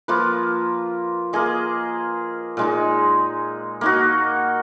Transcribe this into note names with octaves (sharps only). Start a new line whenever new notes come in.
F3 A#3 F4 B4
A#3 F4 G#4 D#5
A#2 G#3 D#4
A#3 D#4 F#4